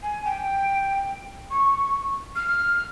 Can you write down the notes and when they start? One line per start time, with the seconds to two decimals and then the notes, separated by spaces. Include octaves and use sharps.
0.02 G#5
0.24 G5
1.50 C#6
2.35 F6